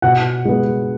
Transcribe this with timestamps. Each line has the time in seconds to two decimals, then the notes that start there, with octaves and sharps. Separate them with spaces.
0.02 B2 F#5
0.45 G#3 B3